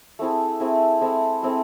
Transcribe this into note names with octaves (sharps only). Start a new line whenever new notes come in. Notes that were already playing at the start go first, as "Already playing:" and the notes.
A3 C4 E4 G#4
A3 C4 E4 G#4
G#3 C4 E4 A4
G#3 C4 E4 A4